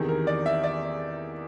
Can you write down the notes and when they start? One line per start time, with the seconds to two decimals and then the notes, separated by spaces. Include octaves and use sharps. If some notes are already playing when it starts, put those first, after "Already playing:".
Already playing: E2 C3 D#3 G#4
0.09 A#4
0.27 D5
0.46 E5
0.63 D5